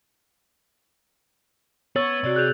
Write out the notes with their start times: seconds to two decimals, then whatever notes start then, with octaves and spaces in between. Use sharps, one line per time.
1.96 B3 C#5 E6 A6 F#7
2.24 C3 F#4 D5
2.36 G#4 F#6 G6 F7